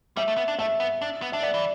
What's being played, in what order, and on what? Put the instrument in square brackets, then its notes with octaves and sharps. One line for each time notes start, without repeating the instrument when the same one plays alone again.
[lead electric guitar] G3 [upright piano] E5
[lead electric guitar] A3
B3
D4
[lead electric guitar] A3 [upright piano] E5
[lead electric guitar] B3
D4
B3
[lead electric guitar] D4 [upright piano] E5
[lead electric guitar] B3 [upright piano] D5
[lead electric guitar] E3